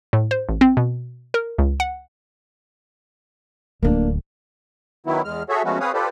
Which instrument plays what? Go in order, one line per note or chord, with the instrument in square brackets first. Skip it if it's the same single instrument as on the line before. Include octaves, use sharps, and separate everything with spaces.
[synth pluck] A2
C5
A1
C4
B2
A#4
C#2
F#5
[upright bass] D1 D2 [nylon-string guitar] A#3 D4
[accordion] D#3 F#3 B3 E4
E2 G#3 F6
F#4 G#4 A4 C#5 E5
F3 G#3 A3 B3 C#4 F#4
C4 G#4 B4 C#5 F5 D#6
F4 G4 A4 B4 C5 D5